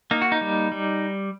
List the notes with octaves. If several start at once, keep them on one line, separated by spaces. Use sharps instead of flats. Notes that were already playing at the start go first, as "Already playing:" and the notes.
A#3 D#4
F#4
D#4
G3
G3